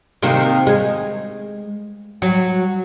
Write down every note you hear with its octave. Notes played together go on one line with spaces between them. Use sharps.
C3 D#3 A#3
G#3
F#3